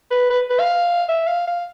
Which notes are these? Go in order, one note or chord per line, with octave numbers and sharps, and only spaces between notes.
B4
B4
B4
F5
E5
F5
F5